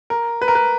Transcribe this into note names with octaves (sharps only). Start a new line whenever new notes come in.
A#4
B4
A#4
B4